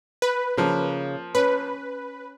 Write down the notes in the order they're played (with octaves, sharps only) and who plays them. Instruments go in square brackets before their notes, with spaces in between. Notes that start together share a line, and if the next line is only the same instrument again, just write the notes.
[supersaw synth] B4
[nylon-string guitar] C#3 [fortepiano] F3 A#3
[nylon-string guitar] C#4 [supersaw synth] B4